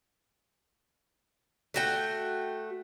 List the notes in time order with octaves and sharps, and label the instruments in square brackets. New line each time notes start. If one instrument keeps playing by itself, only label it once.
[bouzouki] A3 F#4 G5